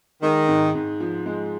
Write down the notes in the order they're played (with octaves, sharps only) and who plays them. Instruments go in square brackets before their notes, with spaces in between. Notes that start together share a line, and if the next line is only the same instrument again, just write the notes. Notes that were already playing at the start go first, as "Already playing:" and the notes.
[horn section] D#3 [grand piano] G#3
[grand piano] G#2
G#2
F3
G#3